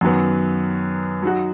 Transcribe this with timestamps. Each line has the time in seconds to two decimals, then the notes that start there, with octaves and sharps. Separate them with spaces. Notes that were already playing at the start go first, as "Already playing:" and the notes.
0.01 F#2 D#3 F#3 B3
1.22 F#3 D#4 F#4